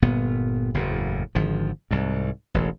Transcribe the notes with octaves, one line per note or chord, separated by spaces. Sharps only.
G1 A#2 B3
F#1 E2 A2
G#1 D3 F3
C2 G#2
E1 A1